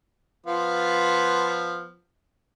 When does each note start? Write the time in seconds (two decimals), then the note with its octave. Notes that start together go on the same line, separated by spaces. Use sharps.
0.47 F3 B3 F4